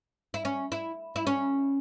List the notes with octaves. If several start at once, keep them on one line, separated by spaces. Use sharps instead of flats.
E4
C#4
E4
E4
C#4